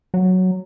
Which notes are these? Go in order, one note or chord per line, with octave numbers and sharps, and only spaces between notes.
F#3